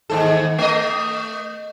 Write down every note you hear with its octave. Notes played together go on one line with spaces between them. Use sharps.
D#2 G#2 A4
A3 D#5